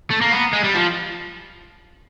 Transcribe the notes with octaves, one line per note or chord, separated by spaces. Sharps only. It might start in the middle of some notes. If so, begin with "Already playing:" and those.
A3
A#3
B3
G#3
G3
F3